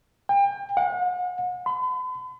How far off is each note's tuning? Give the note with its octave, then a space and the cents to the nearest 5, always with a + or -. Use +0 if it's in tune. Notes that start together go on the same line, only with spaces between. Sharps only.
G5 +35
F#5 -40
B5 +45